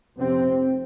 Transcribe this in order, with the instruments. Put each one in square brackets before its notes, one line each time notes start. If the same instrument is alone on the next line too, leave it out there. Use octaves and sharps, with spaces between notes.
[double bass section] F1 F2 C3 C4